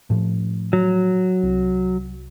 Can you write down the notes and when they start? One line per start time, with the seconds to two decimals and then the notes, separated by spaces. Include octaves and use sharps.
0.10 A2 F3
0.73 F#3
1.43 C2